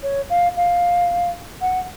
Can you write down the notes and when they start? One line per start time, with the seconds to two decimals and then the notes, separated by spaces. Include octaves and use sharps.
0.03 C#5
0.30 F5
0.57 F5
1.61 F#5